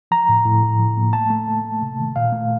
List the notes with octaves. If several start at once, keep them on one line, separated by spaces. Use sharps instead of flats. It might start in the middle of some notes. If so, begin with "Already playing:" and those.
F3 A#5
A2
A2
A2
F3
A#3
A3 A5
A3
A3
A3
C3
D#3
A#2 F5
A3